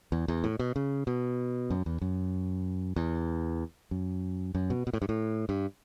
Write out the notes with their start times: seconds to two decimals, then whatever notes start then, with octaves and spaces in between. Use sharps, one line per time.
0.12 E2
0.28 E2
0.44 A2
0.59 B2
0.76 C#3
1.07 B2
1.70 F#2
1.86 E2
2.02 F#2
2.96 E2
3.91 F#2
4.55 F#2
4.70 B2
4.87 B2
4.93 A2
5.02 G2
5.09 A2
5.49 G2